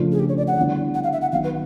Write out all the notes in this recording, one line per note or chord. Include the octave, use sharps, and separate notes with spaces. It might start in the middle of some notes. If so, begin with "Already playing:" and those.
Already playing: C#3 F3 A3 D4 F4
G#4
G4
C#5
D5
F#5
D3 G3 B3 E4
F#5
F5
E5
F#5
D#3 F#3 B3 F5
B4